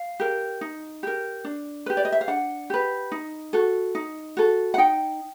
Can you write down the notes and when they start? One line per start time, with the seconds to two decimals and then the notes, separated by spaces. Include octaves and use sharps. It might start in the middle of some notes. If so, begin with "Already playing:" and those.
Already playing: F5
0.20 G4 A#4
0.61 D#4
1.03 G4 A#4
1.44 D4
1.86 G4 B4
1.97 D5
2.05 D#5
2.12 E5
2.21 F5
2.28 D4 F#5
2.70 G4 B4
3.12 D#4
3.53 F#4 A4
3.95 D#4
4.37 F#4 A4
4.74 F#5
4.78 D#4 G5